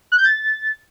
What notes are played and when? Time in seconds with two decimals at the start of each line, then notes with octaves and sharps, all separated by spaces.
0.12 F#6
0.18 G6
0.25 A6